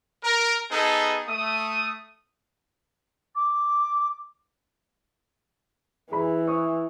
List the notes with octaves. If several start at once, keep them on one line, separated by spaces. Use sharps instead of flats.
A#4 A#5
B3 D#4 G#4 A4
A3 D#6
D6
E3 G#4 B5
E5 C#6 D#6